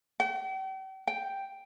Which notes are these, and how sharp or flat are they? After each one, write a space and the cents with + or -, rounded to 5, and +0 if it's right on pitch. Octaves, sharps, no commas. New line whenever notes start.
G5 -40
G5 +0